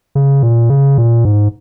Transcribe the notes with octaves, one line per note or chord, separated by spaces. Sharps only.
C#3
A#2
C#3
A#2
G#2